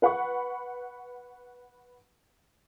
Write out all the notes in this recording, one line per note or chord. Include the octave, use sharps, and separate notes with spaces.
B4 F#5 B5 C#6